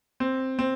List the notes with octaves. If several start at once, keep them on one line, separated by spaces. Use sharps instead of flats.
C4
C4